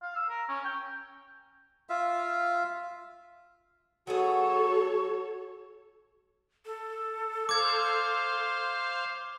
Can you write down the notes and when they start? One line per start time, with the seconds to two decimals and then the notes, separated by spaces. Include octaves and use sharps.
0.02 F5
0.16 E6
0.29 A#4
0.49 C#4
0.65 G5
1.90 F4 E5 F5
4.07 F#3 B3 F#4 G#4 A4 C#5
6.66 A4
7.49 C5 F5 D6 G#6